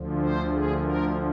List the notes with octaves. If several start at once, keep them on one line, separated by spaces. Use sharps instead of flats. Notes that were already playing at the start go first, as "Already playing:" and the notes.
Already playing: D2 D3 F3
C5
G#4
A#4